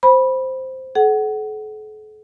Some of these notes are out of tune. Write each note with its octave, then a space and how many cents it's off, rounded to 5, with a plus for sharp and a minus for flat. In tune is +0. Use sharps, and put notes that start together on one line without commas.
C5 +0 B5 -10
A4 -45 F#5 +20